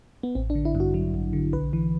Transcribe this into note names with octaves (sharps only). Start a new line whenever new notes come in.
B3
A1 C4
D4
D3
E4
G2
F#4
F#3
A1
D3
B1 B4
E3